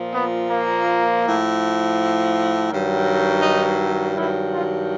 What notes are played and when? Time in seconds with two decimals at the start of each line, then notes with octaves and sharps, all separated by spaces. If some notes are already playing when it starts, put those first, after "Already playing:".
Already playing: A#2 F3
0.14 B3
0.51 A#3
1.24 A2 F3
2.69 G2 D#3 F#3
3.42 D#4
4.15 G2 D#3 F#3 E4
4.53 F4